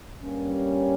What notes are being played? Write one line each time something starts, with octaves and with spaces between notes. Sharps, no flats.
G2 G3 A#3 C#4